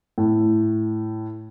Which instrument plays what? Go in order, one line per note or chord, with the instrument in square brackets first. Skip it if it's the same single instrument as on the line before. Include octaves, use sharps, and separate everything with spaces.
[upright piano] A2